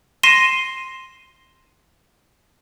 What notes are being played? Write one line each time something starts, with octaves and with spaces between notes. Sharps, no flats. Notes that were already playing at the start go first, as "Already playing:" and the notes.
C6 A#6 C7 D#7 E7 G7